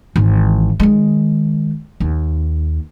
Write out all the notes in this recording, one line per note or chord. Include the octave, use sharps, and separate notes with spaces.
G#1 E3
D#3 G#3
D#2